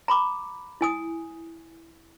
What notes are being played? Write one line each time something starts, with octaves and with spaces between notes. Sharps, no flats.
A#5 B5 D6
E4 G#5 D#6